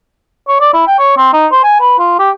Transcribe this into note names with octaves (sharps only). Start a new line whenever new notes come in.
C#5
D5
E4
G5
C#5
C4
D#4
C5
G#5
B4
F4
G4